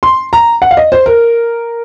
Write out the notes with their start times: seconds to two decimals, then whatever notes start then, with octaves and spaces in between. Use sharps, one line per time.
0.03 C6
0.33 A#5
0.62 F#5
0.71 F5
0.77 D#5
0.92 C5
1.06 A#4